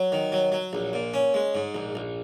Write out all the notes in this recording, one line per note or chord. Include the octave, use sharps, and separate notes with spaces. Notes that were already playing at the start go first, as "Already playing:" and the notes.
Already playing: F#3
D#3
F#3
F#3
A#1
A#2
C#4
G#3
G#2
A#1
A#1